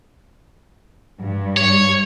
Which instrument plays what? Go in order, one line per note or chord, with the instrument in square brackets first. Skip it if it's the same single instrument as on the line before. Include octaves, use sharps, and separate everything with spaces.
[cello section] G2
[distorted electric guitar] C#5